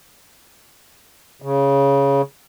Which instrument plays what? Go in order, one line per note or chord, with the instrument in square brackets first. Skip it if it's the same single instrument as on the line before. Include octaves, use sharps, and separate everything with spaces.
[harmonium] C#3